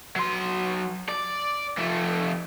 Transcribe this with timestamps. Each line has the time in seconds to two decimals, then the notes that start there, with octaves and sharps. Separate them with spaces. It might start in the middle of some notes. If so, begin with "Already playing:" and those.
0.16 F#3 C6
1.08 D5
1.78 F2 A3